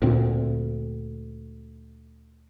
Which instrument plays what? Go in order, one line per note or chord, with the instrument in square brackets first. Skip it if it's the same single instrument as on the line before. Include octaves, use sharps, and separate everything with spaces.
[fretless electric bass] D2 A#2 C4